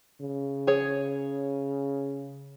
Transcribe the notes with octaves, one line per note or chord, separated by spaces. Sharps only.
C#3
G#4 C#5